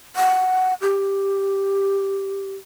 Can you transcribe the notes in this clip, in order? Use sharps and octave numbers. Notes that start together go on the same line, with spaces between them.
F#5
G4